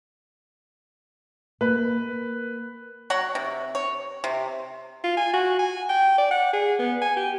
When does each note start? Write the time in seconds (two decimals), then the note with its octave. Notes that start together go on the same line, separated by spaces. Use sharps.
1.61 A#3 B4
3.10 F#3 C#5 F#5
3.35 C3
3.75 C#5
4.24 C3
5.04 F4
5.17 G#5
5.33 F#4
5.59 G#5
5.89 G5
6.18 D5
6.31 F#5
6.53 G#4
6.79 B3
7.02 G#5
7.17 G4